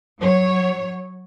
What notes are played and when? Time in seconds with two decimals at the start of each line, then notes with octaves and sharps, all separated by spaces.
0.19 F#3 C#5